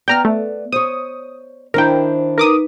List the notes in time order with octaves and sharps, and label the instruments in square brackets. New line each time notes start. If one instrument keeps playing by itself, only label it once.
[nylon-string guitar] B3 D5 [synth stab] G5 A#5 F6
[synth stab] A3
[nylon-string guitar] C5 C#5 [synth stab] D#6
[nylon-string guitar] D#3 D4 E4 [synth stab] A#4 G5 [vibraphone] C5
[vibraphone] D#4 B4 [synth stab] A#4 D6 D#6